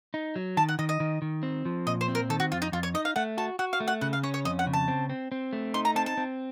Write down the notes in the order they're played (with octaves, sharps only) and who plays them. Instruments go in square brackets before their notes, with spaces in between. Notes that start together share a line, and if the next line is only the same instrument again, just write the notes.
[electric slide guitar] D#4
F#3
[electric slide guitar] D#3 [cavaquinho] A5
[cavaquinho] F#5
[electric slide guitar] D#3 [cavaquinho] D#5
[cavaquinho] D#5
[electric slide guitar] D#3
D#3
C4
F3
[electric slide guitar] A#2 [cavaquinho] D#5
[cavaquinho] C5
[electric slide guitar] C4
[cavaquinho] A#4
[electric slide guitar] D#3 [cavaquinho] A4
[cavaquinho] F#4
[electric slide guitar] F2 [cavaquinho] F4
[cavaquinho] D#4
[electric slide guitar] F2 [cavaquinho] F4
[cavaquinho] C#5
[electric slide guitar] D#4 [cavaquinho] D#5
[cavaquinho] F5
[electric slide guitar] A3 [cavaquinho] F#5
[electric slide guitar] F#4 [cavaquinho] A5
[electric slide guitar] F#4 [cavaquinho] F#5
[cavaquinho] F5
[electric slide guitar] A3
[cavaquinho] F#5
[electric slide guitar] C#3 [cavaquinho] F#5
[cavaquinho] F5
[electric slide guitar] C#4 [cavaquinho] C#5
[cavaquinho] C#5
[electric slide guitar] F2 [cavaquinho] D#5
[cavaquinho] F#5
[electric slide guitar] C#3
[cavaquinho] A5
[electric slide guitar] C4
C4
C4
A3
[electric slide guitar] D#4 [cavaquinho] C6
[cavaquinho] A#5
[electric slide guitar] C4 [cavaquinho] A5
[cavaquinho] A5
[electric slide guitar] C4